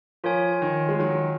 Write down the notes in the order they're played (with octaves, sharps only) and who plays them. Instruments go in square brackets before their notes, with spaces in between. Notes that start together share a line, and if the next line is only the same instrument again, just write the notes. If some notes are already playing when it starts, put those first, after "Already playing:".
[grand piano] F3 [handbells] F4 A#4 C#5 G#5
[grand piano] D#3
G#3
D#3 F#3